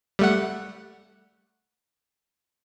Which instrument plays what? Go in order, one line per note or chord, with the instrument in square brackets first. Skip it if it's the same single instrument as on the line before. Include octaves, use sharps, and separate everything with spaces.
[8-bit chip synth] G3 A3 F#5